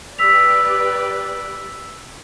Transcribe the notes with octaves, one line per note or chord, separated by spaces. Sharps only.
G4 B4 D5 E6 B6 F7